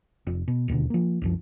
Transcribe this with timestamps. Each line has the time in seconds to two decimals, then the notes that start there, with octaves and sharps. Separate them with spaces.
0.27 F1
0.48 B2
0.68 E1 D#2 B2 D3
0.90 F3 A#3
1.22 C2 F#2 F3